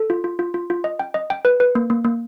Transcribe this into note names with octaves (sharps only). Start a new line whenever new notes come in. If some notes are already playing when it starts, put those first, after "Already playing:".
Already playing: A4
F4
F4
F4
F4
F4
D#5
G5
D#5
G5
B4
B4
A#3
A#3
A#3